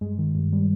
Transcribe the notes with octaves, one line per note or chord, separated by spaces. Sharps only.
G2 G#3
D#3
G2
G3